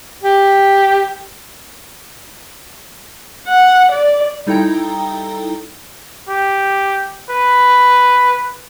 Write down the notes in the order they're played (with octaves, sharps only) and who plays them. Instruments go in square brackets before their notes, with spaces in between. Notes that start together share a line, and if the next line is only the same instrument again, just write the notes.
[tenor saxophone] G4
[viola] F#5
D5
[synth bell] G3 D#4 E4 A4 G5 A#5
[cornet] G4
B4